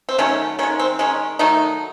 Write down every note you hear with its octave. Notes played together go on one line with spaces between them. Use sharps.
C4
D#3 F#3 A3 C#4
D#3 G#3 C#4
C4
D#3 G#3 C#4
D#3 F#3 A3 D#4